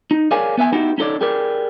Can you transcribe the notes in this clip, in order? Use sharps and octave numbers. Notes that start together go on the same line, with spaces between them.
D#4
G#4 A#4 C#5 D5 F5 G#5
B3 B4 E5 G#5
B3 D#4 E4 F#4 G4
C#4 D#4 A4 C#5 D5
G4 G#4 A#4 B4 D5